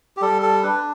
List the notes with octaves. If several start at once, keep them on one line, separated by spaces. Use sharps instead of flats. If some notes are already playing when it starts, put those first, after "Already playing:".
G4
G3 A4
A4
D4 B4